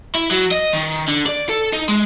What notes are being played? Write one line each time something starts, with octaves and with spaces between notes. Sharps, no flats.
E4
F#3
D#5
D#3
D3
D5
A4
D#4
G#3